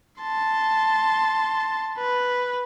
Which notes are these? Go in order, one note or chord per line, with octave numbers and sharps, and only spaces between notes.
A5 C6
B4